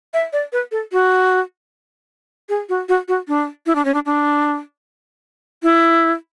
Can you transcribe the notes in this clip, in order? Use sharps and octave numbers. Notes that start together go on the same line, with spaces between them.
E5
D5
B4
A4
F#4
G#4
F#4
F#4
F#4
D4
E4
D4
C#4
D4
D4
E4